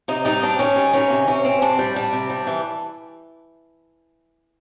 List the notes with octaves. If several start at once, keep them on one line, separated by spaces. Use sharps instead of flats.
C3 D#4
G3 D#4
C4 D4
D#3 C#4
G3
D#3 C#4
C3
C3 C#4
C4
C3 D4
G3
G3 D4
C3
G3
E3